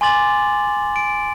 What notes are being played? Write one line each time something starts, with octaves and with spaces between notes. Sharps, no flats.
G#5 C6 D6 A6 F#7
D7